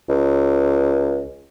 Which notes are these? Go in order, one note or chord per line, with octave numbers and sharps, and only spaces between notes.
C#2